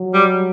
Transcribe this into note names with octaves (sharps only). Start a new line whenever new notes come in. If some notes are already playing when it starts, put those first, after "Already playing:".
Already playing: F#3
G3